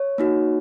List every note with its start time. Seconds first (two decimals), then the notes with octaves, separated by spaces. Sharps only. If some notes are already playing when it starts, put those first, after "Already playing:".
Already playing: C#5
0.18 A#3 D#4 F#4